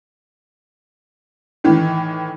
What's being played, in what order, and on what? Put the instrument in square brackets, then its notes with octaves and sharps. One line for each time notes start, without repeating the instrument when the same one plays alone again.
[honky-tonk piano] A2 D#3 E3